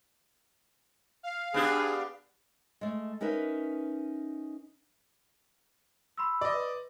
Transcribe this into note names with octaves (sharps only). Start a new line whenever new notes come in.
F5
B3 D4 G4 G#4
G#3 A3
C#4 D#4 A#4 B4 E5
B5 C6 E6
D5 D#5
B4